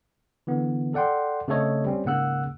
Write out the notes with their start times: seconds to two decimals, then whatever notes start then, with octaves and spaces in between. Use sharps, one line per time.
0.47 D3 E3 B3
0.94 A4 D5 F#5 G5 C6
1.48 C#3 A3 C4 A4 C#5 D#5
1.85 G3 C4 C#4
2.05 G#2 C#3 A#3 F#5 E6 F#6